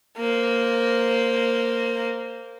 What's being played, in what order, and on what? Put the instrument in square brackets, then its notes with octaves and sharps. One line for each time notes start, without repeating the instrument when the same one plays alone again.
[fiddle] A#3 C5